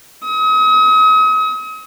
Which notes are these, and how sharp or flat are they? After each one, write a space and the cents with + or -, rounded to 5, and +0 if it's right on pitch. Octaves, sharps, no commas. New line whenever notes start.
D#6 +40